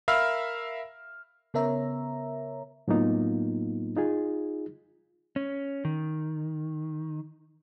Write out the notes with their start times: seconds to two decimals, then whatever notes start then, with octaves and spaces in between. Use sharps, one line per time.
0.08 A#4 E5 F5 B5 E6 F6
1.54 C#3 B3 A#4 C#5 E5 A#5
2.88 A2 F#3 A#3 B3 D#4 F4
3.96 D#4 F4 G#4
5.36 C#4
5.85 D#3